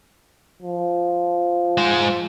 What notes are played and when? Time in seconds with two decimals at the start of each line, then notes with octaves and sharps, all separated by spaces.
0.62 F3
1.78 G#3 C5